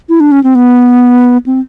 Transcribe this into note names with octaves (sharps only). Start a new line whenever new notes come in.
E4
D4
C#4
C4
B3
C4